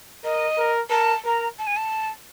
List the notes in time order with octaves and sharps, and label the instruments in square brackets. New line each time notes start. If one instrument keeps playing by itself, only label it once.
[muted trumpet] A#4 [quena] D#5
[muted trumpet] A#4
[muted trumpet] A#4 [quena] A5
[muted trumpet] A#4 [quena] A#5
[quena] A5
G#5
A5